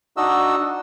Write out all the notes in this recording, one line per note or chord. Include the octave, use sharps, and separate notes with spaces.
D4 D#4 F#4 D#5 E6